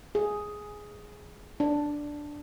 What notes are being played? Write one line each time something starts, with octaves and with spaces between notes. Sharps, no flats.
G#4
D4